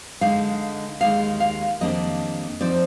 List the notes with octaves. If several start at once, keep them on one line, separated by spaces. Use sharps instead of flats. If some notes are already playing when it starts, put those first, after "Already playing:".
D3 G#3 D#4 F5
D#2 D#3 G#3 D#4 F5
F5
F2 D#3 G3 A#3 D4 D#5
F3 C4 D#4 D5